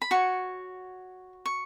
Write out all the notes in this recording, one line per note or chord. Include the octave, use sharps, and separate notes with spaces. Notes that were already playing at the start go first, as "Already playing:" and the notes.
B5
F#4 C#5 C#6
C#6